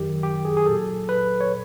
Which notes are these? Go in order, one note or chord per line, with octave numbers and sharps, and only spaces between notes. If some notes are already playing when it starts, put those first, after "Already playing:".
Already playing: F#2 D#3 F#3 G4
G4
G#4
G#4
A#2 F#3 A4
B4
C#5